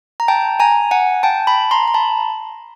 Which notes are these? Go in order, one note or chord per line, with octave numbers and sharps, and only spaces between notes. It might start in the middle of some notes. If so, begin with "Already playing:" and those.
A#5
G5 A5
G#5 A#5
F#5 G#5
G5 A5
A5 B5
A#5 C6
A#5
A5 B5